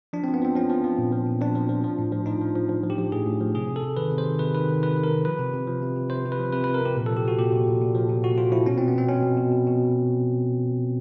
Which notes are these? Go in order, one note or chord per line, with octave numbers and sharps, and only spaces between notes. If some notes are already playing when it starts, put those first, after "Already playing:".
F3 D4
F3 C4
B3
F3 C4
F3 C#4
F3
F3
A#2
F3
A#2
F3 D4
F3
F3
F3
A2
F3
F3 D#4
F3
F3
F3
F3
G4
F3
A2 G#4
A2
F3
C3 G#4
C3
A4
C3
D#3 B4
C3
C5
D#3
C3 B4
D#3 B4
D#3
C3 B4
D#3
A#4
C3
F3 B4
C3
C3
F3
C3
C3
C3 C5
C3
B4
F3
C3 B4
C3 B4
A#4
C3 G4
A#2
F3 A4
G4
F3 F#4
A#2 G4
A#2
A#2
A#2
F3
A#2
A#2 F#4
F3 F4
F3 E4
B2 C#4
B2 C4
B3
B2 C4
B2 C#4
B2
B2
B2
B2